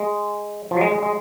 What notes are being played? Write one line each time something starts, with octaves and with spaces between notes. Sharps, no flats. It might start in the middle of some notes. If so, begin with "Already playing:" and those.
Already playing: G#3
F3
F#3
G#3
G#3
G#3